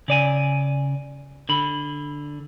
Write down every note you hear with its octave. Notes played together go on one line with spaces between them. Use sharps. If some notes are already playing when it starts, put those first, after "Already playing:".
C#3 D5 G#5
D3 B5